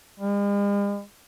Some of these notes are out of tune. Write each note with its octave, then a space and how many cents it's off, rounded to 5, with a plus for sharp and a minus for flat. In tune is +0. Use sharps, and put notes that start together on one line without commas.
G#3 -45